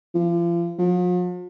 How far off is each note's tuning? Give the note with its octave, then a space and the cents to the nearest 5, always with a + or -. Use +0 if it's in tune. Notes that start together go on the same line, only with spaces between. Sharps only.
F3 -35
F3 +45